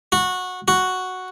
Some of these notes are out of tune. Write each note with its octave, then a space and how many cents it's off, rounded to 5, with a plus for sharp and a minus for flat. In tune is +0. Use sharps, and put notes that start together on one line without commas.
F#4 -15
F#4 +0